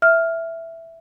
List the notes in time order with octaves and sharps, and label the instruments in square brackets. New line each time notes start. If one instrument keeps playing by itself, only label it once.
[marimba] E5 F6